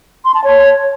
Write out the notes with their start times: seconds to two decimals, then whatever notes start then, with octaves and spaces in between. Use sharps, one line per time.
0.25 C6
0.34 A5
0.44 C#5